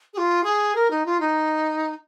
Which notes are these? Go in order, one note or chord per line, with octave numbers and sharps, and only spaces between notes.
G#4
F4
G#4
A#4
D#4
F4
D#4